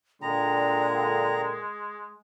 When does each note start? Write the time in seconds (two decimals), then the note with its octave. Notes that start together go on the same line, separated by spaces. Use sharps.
0.22 A#2 D3 G#3 G5 A#5